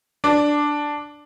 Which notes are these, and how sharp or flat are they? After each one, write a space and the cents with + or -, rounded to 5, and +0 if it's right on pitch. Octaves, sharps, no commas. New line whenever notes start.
D4 +0